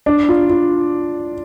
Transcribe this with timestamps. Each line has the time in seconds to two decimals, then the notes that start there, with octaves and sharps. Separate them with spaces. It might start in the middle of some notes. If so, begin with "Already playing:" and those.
0.06 D4
0.29 F4
0.49 F4